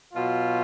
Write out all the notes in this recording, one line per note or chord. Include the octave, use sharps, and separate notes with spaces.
B2 F#3 F4